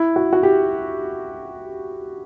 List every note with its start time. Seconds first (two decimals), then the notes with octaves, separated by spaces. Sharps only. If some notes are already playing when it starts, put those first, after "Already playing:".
Already playing: E4
0.16 F#4
0.33 F#4
0.43 G4